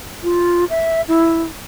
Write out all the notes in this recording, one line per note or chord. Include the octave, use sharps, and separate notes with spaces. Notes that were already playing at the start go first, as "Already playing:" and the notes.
F4
E5
E4